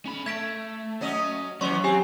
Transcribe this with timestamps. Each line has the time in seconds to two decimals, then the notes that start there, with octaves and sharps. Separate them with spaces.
0.06 C#4 B5
0.26 A3 G#6 B6 D7
1.01 F#3 C#4 D#5
1.61 E3 F#3 C#4 C#5 C6 C#6
1.84 C4 G4 G#5